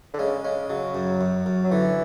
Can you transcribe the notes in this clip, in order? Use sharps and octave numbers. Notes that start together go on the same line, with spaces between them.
D3
C#3 G#3
C#3 G#3
C#3 F#3
F#2
F#2
F#2
F#3
D3 E3